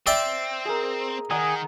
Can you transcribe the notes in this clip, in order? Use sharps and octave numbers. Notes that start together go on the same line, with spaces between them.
C4 D5 E5 G5
G#4 A#4
D#3 G#4 F#5 A#5